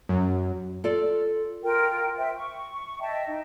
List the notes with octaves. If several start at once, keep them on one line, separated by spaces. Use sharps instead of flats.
F#2
F4 A4 D5
F4 A#4 G5
C5 E5 G5
C#6
D#5 E5 G5 A5
D#4